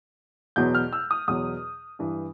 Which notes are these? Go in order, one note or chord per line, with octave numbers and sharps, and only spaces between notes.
E2 B2 F#3 G6
F6
E6
D#6
E2 B2 F#3 D#6
G2 E3